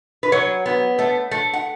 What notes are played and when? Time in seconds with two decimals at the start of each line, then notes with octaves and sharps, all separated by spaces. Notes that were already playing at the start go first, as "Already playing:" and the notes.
0.23 B4
0.32 F#3 C#5
0.66 B3
0.99 A3
1.31 A3
1.53 F#5